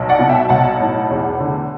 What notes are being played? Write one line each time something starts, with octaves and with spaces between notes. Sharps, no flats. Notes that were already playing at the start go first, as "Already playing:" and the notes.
Already playing: B1
D5 F#5
B2
E5 G5
B1 F#5 A5
A2
E2
D3